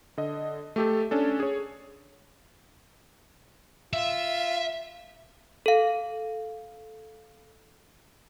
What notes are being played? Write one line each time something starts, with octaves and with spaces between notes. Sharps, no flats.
D3 D#5
A3 G4 A4
C#4 D4 A4
G#4 C#5
F4 E5
A4 F5